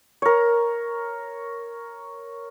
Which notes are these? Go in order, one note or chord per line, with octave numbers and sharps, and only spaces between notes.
A#4 C#5